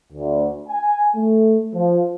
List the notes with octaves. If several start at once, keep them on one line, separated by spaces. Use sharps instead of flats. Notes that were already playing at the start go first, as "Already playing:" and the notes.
D2
G#5
A3
F3